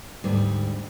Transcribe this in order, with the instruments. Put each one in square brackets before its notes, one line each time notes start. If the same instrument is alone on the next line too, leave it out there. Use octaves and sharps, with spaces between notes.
[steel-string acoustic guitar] D2 G#2 G3